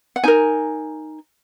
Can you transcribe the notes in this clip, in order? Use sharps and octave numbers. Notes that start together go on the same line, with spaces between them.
F#5
D#4 A#4 G#5